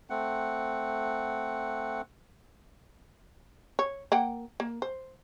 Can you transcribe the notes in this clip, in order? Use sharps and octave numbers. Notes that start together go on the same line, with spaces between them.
A3 C4 F#5
C#5
A#3 F#5 G5
A#3
C5